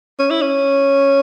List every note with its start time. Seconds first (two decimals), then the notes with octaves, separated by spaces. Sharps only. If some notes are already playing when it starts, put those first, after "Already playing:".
0.19 C#4
0.30 E4
0.42 C#4